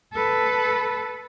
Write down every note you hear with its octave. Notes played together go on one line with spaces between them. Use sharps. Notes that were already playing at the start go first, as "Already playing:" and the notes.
A4 B4